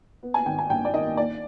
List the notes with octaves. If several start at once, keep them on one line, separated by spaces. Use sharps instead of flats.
B3
G#5
G#1 G5
G#5
G2 G5
D5
D#3 D#5
D#2 D5